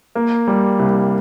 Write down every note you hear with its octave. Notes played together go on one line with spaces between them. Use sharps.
A#3
G3
C2